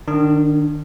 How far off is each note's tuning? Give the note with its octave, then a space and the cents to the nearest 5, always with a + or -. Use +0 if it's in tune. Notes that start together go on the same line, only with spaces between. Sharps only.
D#3 -30 D4 +0